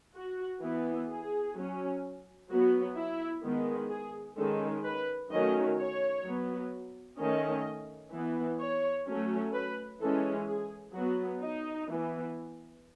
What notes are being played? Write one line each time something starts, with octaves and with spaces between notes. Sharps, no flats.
F#4
E3 B3
G#4
F#3 C#4
F#3 B3 F#4
E4
D#3 G#3 B3
G#4
D#3 G#3 C#4 A4
B4
D#3 F#3 A3 C#4 D#5
C#5
F#3 B3
D#3 A3 C#4 D#5
E3 B3
C#5
F#3 A3 C#4
B4
E3 G#3 C#4 A4
G#4
F#3 B3 F#4
D#4
E3 B3